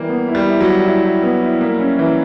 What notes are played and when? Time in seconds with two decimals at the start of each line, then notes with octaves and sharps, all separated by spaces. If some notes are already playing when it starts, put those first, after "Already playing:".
Already playing: E3 G3 A#3
0.09 B3
0.28 E4
0.35 G3
0.47 E4
0.61 F#3
0.66 G3
0.85 E4
1.05 E4
1.23 B3
1.42 E4
1.61 A#3
1.80 C#4
1.99 E3